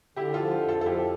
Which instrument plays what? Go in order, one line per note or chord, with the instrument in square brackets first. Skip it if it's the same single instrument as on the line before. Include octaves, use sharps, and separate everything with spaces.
[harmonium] D3 [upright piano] E4 G4
[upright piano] F4 A4
[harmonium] F3
F2
[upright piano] F4 A4
A4
[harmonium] F3 [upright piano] E4 G4